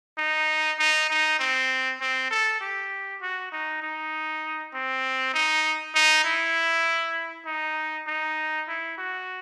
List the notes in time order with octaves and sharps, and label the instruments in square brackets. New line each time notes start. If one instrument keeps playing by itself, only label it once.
[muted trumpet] D#4
D#4
D#4
C4
C4
A4
G4
F#4
D#4
D#4
C4
D#4
D#4
E4
D#4
D#4
E4
F#4